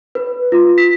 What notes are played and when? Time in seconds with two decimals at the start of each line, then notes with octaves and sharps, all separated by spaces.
0.15 B4
0.52 F4
0.78 B6